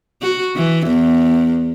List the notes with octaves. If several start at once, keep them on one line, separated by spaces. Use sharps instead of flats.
F#4
E3
E2